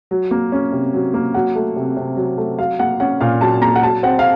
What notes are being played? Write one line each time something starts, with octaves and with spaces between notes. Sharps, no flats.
F#3
A#3
C#4
C3
F#3
A#3
F#3 F#5
A3
C3
C3
F#3
A3
F#3 F5
A#3 F#5
C#4 F#5
A#2 F5
F#3 A5
A#3 A#5
F#5
F#3 A5
C4 F#5
F5